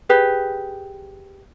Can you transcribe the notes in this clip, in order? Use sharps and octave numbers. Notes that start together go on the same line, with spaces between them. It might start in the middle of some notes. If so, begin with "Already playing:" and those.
G4 G#4 B4